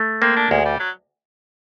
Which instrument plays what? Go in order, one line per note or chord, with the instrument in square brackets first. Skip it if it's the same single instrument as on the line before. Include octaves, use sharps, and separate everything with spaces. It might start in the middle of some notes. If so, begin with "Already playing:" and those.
Already playing: [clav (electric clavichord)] A3
[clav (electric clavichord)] A#3 [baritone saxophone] C4
[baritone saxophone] D4
[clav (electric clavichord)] D2 [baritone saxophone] G#3
[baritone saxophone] G3
F#3